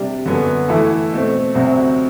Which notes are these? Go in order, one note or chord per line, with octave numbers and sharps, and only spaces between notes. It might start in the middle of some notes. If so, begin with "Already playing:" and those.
Already playing: C3 G3 D4 G4
F#2 D3 F#3 B3
E3 A3 E4 A4
B2 A3 C4
D2 C3 F#3 C4 F#4